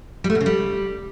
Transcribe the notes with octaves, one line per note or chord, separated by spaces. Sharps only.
G3
A3
B2
C#3
G3